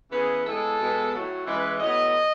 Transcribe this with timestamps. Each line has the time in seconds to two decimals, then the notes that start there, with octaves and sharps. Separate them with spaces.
0.11 C#3 E3 B3 G#4
0.45 A2 G#3 B3 A4
0.78 B2 G#3 B3
1.13 A2 F#3 A3
1.46 C#3 E3 G#3 B4
1.79 A2 F#3 B3 D#5